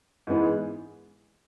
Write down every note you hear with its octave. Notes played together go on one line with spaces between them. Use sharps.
G#2 E3 G#3 B3